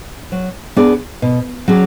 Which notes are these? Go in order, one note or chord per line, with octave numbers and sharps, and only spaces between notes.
F#3
B3 D4 G#4 D5
B2
F#3 C#4 G#4 D5